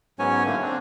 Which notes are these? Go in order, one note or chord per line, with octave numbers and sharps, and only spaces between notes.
G#2 F#3 B3 C#4 C#5 G#5
A2 D3 F#3 A3 A#3
C4 D4